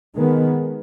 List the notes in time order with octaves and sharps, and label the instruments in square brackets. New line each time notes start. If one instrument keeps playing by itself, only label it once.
[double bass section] D#3 G#3 B3